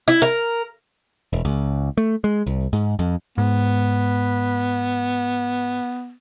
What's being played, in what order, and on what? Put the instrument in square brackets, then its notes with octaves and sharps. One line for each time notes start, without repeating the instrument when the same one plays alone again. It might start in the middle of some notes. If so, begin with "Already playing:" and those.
[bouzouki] E4
A#4
[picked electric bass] E1
C#2
A3
G#3
C2
G#2
F2
[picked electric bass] G#2 [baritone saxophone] B3